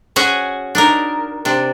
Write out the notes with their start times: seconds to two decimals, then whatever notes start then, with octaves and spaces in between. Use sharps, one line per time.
0.16 C#4 F#4 G#4 G#5
0.75 D4 D#4 A#4
1.45 C3 D4